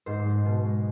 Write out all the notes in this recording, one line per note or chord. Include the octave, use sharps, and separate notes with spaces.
G#2 C5
G#3
B2
G#3